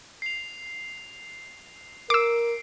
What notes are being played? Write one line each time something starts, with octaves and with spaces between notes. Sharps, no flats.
C7 F7
A#4 D6 E6 C7 D7